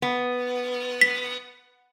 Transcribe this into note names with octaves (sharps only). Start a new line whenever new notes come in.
B3
B6